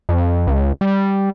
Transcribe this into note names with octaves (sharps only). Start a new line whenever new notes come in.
F2
C#2
G3